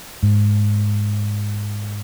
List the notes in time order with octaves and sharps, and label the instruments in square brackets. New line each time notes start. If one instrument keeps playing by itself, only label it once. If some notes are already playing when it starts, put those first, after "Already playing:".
[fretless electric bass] G#2